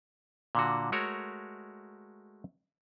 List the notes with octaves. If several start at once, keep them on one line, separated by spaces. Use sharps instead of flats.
A#2 D3 F#4
G#3 A3 F#4 A#4 C#5